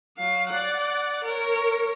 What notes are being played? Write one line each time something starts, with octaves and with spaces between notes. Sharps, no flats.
F#3 F5
D5 F#5
A#4 C#5